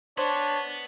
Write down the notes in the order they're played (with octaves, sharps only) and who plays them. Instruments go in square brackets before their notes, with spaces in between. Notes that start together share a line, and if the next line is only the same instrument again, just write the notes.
[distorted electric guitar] B3 [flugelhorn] D4 [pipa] C5 [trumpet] C#5